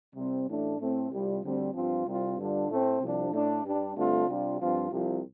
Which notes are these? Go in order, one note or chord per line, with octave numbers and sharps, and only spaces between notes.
C2 C3 G3 C4
A1 A2 A3 D4
A2 A3 C4
C2 C3 G3 F4
D2 D3 G3 C4
G2 F3 C4 F4
C2 C3 G3 C4 F4
G2 D3 G3 D4 F4
A2 A3 C4
C2 C3 F3 D4
A2 A3 D4
G2 G3 D4
G2 D3 A3 C4 F4
C3 G3 D4 F4
G2 F3 C4 F4
C2 C3 F3